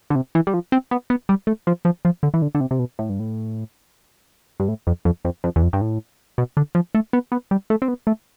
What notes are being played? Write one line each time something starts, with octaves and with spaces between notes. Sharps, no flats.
D3
C3
E3
G3
F3
C4
B3
B3
G3
A3
F3
F3
F3
D3
E3
D3
D3
C3
C3
B2
A2
G2
A2
G2
A2
F2
F2
F2
F2
E2
F2
G2
A2
B2
D3
F3
A3
B3
B3
G3
A3
C4
B3
A3